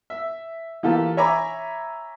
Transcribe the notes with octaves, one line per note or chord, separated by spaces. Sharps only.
E5
E3 A#3 F4 G4 A4
C#5 E5 G#5 A#5 B5 D6